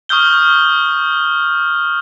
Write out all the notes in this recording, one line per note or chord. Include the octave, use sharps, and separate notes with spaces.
C#6 D#6 F6 G6 G7